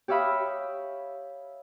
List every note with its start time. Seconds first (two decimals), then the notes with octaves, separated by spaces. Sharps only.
0.08 G4 C#5 E5 F5 B5 D#6